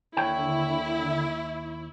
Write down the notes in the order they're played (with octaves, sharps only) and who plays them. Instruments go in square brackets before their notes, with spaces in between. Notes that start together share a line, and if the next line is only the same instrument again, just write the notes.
[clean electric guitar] D#2 C#5 G5 [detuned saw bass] D3 [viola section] E4